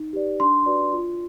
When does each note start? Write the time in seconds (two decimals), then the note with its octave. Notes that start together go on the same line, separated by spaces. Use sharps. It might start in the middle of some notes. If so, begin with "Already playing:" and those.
Already playing: D#4
0.13 G4 B4 D5
0.40 D4 C6
0.66 F#4 B4 D5
0.93 F4